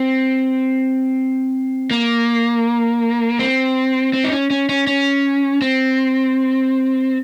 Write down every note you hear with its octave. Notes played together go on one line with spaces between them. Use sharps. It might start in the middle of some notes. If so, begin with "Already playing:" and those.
Already playing: C4
A#3
C4
C4
D#4
C#4
C#4
C#4
C#4
C4